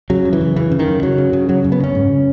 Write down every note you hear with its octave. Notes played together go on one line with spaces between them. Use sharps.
C#3 F#3
F#2
E3
F#2
C#3 E3
C#3
D#3
F#2
F#2 F#3
C#3
C#3
F#2 F#3
F#2
B3
C#3 C#4
G#2